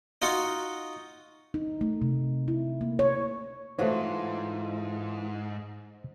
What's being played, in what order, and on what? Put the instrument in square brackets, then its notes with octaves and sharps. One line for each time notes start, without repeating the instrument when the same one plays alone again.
[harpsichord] D#4 F4 F#4 F#5
[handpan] D#4
A3
C3
E4
A#3
C#5
[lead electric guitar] G#2 [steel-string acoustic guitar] E3 F4 A4 [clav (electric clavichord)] A3 F#4 C#5 [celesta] C5